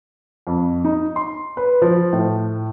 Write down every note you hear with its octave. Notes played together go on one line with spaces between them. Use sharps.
F2
D#4
C6
B4
F3
A2